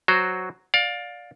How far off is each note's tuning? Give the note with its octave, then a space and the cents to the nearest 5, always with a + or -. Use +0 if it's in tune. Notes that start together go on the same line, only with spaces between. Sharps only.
F#3 +0 F#4 +0 C5 +0
D5 +0 F5 +25